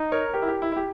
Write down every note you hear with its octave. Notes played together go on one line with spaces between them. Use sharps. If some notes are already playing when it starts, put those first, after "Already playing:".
Already playing: D#4
A#4 C#5
G4 A#4
E4
G4
E4
E4
G4